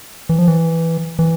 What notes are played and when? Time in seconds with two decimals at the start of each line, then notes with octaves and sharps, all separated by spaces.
0.29 E3
0.39 F3
0.48 E3
1.19 E3